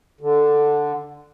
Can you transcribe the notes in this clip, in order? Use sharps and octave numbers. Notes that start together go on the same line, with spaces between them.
D3